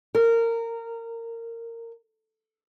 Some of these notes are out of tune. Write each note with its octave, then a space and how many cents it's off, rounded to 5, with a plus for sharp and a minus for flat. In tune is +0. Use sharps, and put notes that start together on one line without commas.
A#4 -20